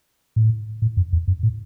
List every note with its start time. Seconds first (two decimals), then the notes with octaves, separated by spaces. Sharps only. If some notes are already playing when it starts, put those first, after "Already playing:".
0.36 A2
0.82 A2
0.97 F#2
1.13 E2
1.28 F#2
1.43 A2